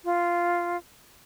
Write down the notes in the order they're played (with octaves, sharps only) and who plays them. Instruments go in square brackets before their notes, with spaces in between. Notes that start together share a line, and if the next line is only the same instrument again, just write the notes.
[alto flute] F4